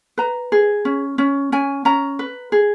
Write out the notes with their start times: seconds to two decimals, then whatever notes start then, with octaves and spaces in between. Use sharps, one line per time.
0.18 B4 A#5
0.52 G#4
0.85 C#4
1.18 C#4
1.52 C#4 G#5
1.85 C#4 A#5
2.19 B4
2.52 G#4